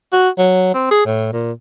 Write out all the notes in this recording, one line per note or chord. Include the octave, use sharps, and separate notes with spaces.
F#4
F#3
C4
G#4
A2
A#2